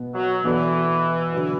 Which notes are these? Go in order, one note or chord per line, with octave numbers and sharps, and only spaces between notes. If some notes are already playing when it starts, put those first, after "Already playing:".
Already playing: B2 B3 B4
F#3
B2 E3 B3 F#4 A4 D5
D3 F#3 D4 B4